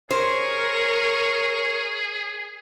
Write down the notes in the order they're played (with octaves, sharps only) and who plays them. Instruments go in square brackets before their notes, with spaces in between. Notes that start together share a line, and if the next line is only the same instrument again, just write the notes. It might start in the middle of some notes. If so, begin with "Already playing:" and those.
[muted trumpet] G#4 [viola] A#4 C#6 [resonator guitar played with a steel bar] C5 [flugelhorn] C#5